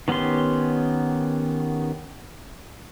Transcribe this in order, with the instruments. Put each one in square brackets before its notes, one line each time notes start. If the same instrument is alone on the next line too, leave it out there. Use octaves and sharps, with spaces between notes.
[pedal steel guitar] D#3 B3 C#4 G4 C6